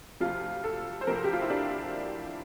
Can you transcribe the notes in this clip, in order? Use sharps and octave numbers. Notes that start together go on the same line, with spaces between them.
D2 C3 F3 F4
A4
C5
D2 C3 F3 A#4
G4
F4
E4
D4